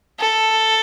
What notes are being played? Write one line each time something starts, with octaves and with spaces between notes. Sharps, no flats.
A4